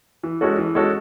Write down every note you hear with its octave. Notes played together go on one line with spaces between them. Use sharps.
E3
G#3 C#4 F#4 A4
E3
G#3 C#4 F#4 A4